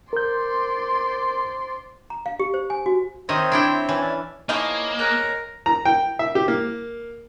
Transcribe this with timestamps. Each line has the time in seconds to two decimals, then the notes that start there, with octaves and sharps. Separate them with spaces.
0.13 A#4 C5 D5 C6 G6
2.10 A#5
2.26 F5
2.40 G4
2.54 C5
2.70 G#5
2.86 F#4
3.29 D#3 C4 C5 C#5 D#5 E5
3.52 D4 E4 G5
3.89 E3 C#4
4.01 D4 E4 D5
4.49 F3 A#3 D#4 E4 G#4 C#5 D#5
4.99 G#4 A#4 C#5 F#6
5.66 A#5
5.85 G5
6.19 E5
6.35 G4
6.48 A#3